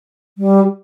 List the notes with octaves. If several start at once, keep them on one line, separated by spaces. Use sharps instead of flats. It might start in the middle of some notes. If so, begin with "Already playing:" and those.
G3